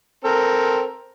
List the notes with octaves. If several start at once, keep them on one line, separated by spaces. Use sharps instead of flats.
C4 A4 A#4